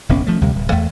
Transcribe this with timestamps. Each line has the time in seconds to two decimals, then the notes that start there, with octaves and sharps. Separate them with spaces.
0.09 F1 A#1 B3 C#4
0.27 F3 A3
0.41 D2 C3 G3
0.55 D1
0.72 E2 A3